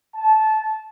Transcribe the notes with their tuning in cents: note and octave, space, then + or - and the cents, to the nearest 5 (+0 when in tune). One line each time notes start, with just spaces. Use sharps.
A5 -20